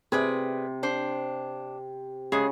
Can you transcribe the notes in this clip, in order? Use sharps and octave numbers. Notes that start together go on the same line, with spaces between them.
C3 G#4 B4 D5
D4 C5
C#3 G#3 G#4